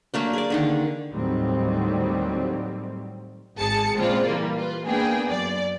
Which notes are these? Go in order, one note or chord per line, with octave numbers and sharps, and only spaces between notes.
F#3 A3 A#3 D4
G#4 D5
D3 D#3 D4
D#2 A2 D#3 F#3 G3 C4
G#1 G#4 A5 C#7
A#2 C#3 G#3 C4 F4 D5
E3 G3 A#3
F4 B4
A#3 B3 D4 G#4 G5
F#2 D5